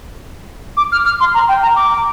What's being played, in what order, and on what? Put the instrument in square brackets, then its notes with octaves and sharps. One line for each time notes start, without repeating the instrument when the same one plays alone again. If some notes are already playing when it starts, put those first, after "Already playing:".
[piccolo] D6
F6
F6
C6
A#5
G5
A#5
D6